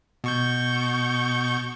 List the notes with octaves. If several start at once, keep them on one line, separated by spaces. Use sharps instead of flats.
B2 C#6 G6